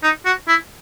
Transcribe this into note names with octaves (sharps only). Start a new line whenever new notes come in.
D#4
F#4
E4